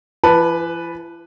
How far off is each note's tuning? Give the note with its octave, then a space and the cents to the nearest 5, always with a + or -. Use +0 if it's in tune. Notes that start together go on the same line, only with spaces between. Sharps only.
E3 +45 B4 +0 A5 +0